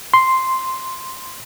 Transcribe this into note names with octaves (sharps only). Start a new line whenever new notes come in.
C6